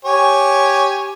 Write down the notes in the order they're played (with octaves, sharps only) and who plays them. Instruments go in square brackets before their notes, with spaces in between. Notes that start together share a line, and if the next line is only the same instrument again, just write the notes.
[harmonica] G4 C#5 G#5